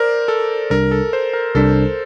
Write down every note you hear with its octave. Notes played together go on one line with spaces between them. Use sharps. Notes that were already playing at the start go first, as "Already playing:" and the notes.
Already playing: A#4 C5 D5
A4
C2 C3 G3 D4 A#4
A4
C5
A#4
C2 C3 G3 D4 A4